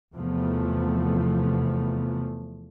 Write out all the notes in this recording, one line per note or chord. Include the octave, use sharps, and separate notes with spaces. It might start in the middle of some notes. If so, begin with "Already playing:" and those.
E2 C3 F3 A3 B3